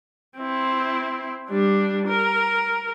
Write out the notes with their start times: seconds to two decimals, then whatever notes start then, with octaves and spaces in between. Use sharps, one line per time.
0.38 C4 E4
1.49 G3 D4
2.07 A#4